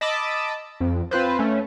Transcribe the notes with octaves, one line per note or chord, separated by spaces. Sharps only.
D#5 A5 B5 D6 E6
F2
C4 F4 B4 C5
A3 C#4